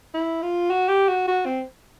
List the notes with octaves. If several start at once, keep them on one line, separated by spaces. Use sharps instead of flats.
E4
F4
F#4
G4
F#4
F#4
C4